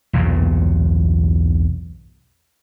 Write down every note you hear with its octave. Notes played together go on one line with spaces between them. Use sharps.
B1 E2 G2 A#2